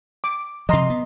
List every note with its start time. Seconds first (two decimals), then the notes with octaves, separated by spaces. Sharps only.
0.24 D6
0.69 C3 F3 D#5 A#5 C6
0.90 B3